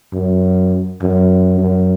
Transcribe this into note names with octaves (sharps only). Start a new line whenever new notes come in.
F#2
F#2
F#2